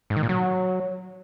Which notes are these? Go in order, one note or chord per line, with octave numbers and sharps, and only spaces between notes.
G#2
D#3
A#2
F#3